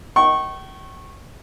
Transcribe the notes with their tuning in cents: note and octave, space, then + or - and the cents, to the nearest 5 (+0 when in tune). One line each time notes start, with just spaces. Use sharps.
G5 -40 C#6 -20